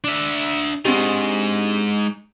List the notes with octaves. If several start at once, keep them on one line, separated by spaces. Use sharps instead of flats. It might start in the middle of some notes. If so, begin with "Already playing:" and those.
D4 E5
G#3 C4 D4 D#4 G4